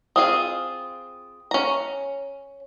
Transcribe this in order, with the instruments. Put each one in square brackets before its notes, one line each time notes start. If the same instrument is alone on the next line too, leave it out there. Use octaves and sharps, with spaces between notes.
[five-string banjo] C4 F4 G#4 [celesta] D#6
[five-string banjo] C#4 A#5